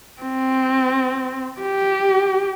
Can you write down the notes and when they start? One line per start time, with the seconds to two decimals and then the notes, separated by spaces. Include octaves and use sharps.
0.22 C4
1.62 G4